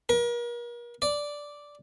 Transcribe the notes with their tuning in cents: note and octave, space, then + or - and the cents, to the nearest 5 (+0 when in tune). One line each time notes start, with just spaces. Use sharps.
A#4 +40
D5 -5